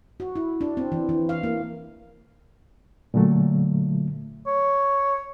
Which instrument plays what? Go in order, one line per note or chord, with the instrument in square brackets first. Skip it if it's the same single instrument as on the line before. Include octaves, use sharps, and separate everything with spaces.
[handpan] F#4
E4
D4
C4
E3
E3
F5
A#3
[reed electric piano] A#2 D3 F#3 A3
[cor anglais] C#5